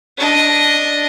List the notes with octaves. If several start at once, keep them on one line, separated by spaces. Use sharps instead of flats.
D4 D#5